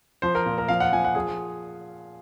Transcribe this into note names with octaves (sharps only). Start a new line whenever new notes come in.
F3 C5
A#4
A#2
A#4
F3 F5
F#5
F3 G#5
F#5
F3 G#4